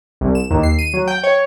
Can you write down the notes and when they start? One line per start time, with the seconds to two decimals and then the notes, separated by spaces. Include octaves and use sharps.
0.21 C2
0.35 E7
0.51 D#2
0.63 C7
0.79 D#7
0.94 F#3
1.08 G5
1.24 C#5